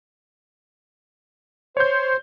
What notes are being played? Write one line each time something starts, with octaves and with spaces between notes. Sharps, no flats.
C5 C#5 G6